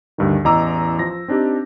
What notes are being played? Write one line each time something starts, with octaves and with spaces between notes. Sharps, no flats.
D2 G2 D#3
A1 E2 D#5 A#5 D6 E6
F3 A#6
C4 D4 D#4 G4